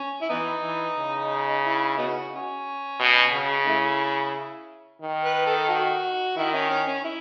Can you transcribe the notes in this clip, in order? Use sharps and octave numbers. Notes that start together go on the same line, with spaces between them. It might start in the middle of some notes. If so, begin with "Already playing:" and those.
Already playing: C#4
E4
E3 B3 D#4
E3
C#3
E4
B3 D#4 F#4
C#4
B2
C#3
A3 C#4 E4
D#3
B4
A4
F#4
D#3 E4
C#4
C#4
C#4
E4